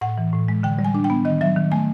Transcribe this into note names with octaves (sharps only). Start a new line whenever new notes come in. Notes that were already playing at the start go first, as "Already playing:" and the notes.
A2 F#5
E3
A2
G#3
D3 G5
G3
G#5
D4
G5
B3
D#3 D#5
F#3 E5
D#3
A3 G#5